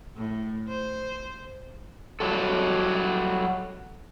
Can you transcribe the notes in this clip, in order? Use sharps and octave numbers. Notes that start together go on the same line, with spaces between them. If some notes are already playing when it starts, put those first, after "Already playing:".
A2
C5
F#3 G3 F#4 A4